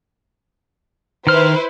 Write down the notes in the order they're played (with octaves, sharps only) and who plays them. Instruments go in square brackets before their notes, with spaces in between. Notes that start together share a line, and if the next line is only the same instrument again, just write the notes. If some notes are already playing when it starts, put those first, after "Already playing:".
[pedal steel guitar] D#3 F6 [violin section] E4 B4 C5